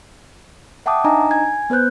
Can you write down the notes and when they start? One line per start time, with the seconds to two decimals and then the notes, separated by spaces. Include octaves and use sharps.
0.86 E5 F#5 G5 A5 D6 D#6
1.04 D4 D#4 D#5 G#5 A#5
1.31 G#5 G#6
1.70 B3 B4 C5 F#6 G6